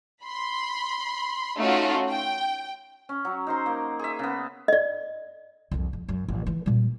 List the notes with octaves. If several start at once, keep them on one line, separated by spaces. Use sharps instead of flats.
B5 C6
A3 C#4 D#4 F4 F#4
G5
C#4
F#3
D#4 C5 C6
A#3
G#4 E5
C#3 B3
D5 D#5
C2 F2
F2
F#2
A1
E3 E4
A#2 G3